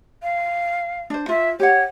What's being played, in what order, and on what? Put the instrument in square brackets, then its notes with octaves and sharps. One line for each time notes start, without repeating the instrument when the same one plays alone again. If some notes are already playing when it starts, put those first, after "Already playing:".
[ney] F5
[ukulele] D4 C5
[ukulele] F4 [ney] E5
[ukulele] G4 F#5 [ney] C#5